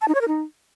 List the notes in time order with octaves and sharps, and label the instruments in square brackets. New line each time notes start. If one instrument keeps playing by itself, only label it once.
[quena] A5
D#4
C#5
A#4
D#4